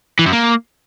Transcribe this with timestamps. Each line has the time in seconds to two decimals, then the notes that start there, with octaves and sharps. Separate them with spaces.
0.19 E3
0.26 F#2
0.32 A#3